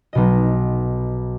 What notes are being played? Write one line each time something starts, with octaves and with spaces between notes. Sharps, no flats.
B1 B2 D#5